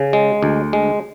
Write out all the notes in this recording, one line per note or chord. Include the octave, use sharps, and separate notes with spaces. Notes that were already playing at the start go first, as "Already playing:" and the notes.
Already playing: C#3
G#3
D2
G#3